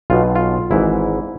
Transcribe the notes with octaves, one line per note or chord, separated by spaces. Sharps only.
B1 B2 F4
F4
G#1 G#2 E3 E4